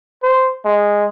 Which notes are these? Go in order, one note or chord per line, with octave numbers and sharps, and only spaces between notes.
C5
G#3